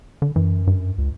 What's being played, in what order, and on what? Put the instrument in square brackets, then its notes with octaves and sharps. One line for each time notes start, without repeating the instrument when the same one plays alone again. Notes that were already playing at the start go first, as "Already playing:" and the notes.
[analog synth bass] D3
[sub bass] F#2 [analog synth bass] E3
[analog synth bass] G2
[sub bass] C#2